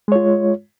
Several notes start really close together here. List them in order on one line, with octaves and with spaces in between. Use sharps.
G#3 C#5 F4